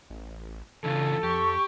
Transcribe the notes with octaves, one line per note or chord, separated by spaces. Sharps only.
A1
C#3 E3 D4 F4 A4
F2 G4 C#6